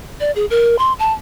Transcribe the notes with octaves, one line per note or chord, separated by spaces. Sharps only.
D5
G#4
A#4
C6
A5